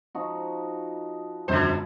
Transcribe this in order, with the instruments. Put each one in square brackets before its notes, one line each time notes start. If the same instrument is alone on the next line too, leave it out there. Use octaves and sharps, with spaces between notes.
[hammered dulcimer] F3 D#4 F#4
[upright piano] E1 F#2 [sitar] D3 C5 [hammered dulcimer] B4 B5